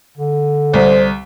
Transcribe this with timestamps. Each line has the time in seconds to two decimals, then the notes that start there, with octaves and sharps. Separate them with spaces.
0.18 D3
0.74 C2 C5